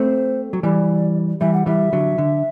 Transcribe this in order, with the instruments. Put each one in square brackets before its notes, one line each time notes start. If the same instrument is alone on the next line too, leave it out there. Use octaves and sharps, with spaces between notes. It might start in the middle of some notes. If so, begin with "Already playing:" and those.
Already playing: [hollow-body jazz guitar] A3 C4 [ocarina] C5
[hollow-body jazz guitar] F#3
[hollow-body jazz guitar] E3 G3 [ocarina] D5
[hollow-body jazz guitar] E3 G3 [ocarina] E5
[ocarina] F#5
[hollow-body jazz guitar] E3 G3 [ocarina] E5
[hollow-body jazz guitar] D3 F#3
D3